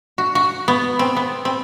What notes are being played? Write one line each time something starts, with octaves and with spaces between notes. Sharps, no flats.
F#4
F#4
B3
C4
B3
C4